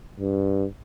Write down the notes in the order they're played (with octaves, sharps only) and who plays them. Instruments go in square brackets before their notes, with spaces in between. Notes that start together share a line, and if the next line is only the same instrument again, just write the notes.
[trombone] G2